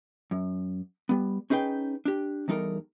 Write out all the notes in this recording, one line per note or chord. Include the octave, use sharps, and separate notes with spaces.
F#2
G3 B3
C#4 D#4 G#4 B4 G5
D4 G4
E2 G3 D#4 A4 A#4